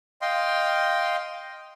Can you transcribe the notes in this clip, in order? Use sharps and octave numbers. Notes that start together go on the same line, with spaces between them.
D#5 F5 G5 C6